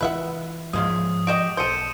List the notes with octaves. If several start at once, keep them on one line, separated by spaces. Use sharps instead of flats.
E3 F4 B4 E5 F#5
G#2 F3 G#3 F5 D#6
F#4 G4 D#5 D7 E7
B1 A4 C5 G6 C#7 D#7